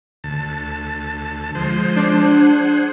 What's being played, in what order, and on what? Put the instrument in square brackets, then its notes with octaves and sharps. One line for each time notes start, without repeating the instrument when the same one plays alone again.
[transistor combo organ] D2 A5
F3 G#3 C5
[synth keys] D4
[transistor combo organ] G#4 C5 F#5